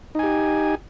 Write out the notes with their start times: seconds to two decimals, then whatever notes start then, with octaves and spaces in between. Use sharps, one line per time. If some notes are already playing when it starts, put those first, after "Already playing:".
0.15 D#4
0.19 G#5
0.23 G4